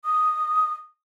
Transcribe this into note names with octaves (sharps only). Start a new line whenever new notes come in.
D#6